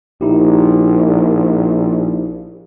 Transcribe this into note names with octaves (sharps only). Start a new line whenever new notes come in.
A#1 D#4 E4 G4